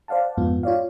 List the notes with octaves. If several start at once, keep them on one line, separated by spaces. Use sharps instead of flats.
C5 D5 F5 F#5 A5
F2 G#2 B3 F4
F4 C#5 D5 F5